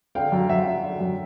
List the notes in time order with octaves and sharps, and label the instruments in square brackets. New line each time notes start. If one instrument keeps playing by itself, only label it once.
[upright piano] D3 [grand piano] F5 G5
[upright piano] F#2
[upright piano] F#2 [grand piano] E5 F#5
[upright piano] F#2
D3
F#2